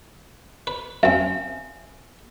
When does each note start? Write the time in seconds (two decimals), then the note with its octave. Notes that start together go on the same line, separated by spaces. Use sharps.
0.67 B4
1.03 F#2 C4 E5 G#5